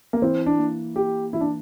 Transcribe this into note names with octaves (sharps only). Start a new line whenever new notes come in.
A#3
E3 C4
D4
A#3
A#3 G4
E3 E4
D4